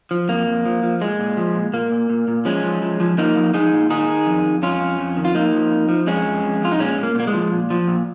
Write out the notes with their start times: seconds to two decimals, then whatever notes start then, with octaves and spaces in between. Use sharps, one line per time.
0.11 F3
0.29 F2 A#3
0.47 F2
0.66 F3
0.83 F3
1.01 A#2 G#3
1.19 A#2
1.37 F3
1.55 A#2
1.73 A#2 A#3
1.92 A#2
2.10 A#2
2.28 A#2
2.45 F3 G#3 C#4
2.63 F3
2.82 F3
3.00 F3
3.18 F3 A#3 D#4
3.36 F3
3.54 F3 D#4 G#4
3.73 A#2
3.90 D#3 D#4 G#4
4.09 D#3
4.26 F2
4.45 F2
4.62 F2 C#4 F4
4.80 F2
4.99 F2
5.17 D#3
5.25 F4
5.35 F3 A#3 D#4
5.53 F3
5.72 F2
5.89 F3
6.07 F2 G#3 C#4
6.25 F2
6.43 F2
6.61 F2 F4
6.72 D#4
6.79 A#2 G#3 C#4
6.98 A#2
7.03 A#3
7.15 A#2 A#3
7.27 G#3
7.34 F3
7.52 A#2
7.70 F3
7.88 A#2